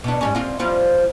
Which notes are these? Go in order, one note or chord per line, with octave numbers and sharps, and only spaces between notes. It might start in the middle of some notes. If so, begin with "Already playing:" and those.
B2 D4
G#2 G3 C#4
C4 F4
F3 G3 F4